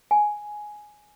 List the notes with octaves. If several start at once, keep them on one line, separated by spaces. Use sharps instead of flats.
G#5